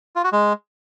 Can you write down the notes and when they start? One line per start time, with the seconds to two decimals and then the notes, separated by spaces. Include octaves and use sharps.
0.16 F4
0.24 F#4
0.32 G#3